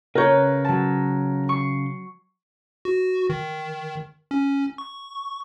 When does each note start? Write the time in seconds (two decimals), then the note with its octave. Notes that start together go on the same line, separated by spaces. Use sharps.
0.15 C#3 A#4 B4 C#5 G6
0.65 F#3 A5
1.49 C#6 C7
2.85 F#4
3.30 D#3
4.31 C#4
4.78 C#6